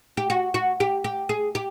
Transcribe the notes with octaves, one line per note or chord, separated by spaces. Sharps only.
G4
F#4
F#4
G4
G4
G#4
G4